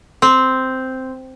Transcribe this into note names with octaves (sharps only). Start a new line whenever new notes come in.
C4